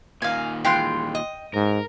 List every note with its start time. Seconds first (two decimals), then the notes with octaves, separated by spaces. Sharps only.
0.22 A#2 D#3 F5 G#5
0.64 E3 G#3 F4 G5 C6
1.15 D#5
1.54 G#2 A#4